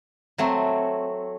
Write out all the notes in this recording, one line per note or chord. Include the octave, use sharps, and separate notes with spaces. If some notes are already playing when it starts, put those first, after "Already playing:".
F#3 A3 C4